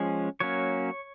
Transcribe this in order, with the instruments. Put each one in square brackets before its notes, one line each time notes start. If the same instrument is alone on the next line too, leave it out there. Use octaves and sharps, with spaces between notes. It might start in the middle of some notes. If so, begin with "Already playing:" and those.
Already playing: [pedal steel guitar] F3 G#3 C#4
F#3 A#3 C#4 C#5